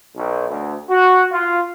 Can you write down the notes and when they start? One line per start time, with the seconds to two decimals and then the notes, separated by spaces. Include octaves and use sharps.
0.16 B1
0.49 D2
0.90 F#4
1.32 F4